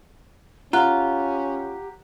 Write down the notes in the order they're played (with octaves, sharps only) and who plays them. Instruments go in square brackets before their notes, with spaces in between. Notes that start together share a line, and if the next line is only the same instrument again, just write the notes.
[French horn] C#4 [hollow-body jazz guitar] F4 [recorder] G4 [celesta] F#5 A#5 F#6